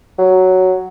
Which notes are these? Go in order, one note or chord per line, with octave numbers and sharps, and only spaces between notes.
F#3